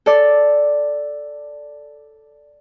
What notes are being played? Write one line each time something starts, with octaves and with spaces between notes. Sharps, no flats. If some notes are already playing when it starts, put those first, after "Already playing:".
A4 D5